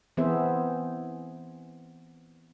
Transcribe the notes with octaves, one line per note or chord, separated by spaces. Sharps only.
E3 B3 C4 G#4 C5 E5